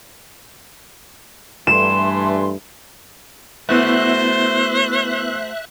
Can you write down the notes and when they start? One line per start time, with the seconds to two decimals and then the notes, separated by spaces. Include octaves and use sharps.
1.67 G2 E3 A3 C6 E7
3.69 A3 B3 E4 F#4 B4 C5 E5 F#6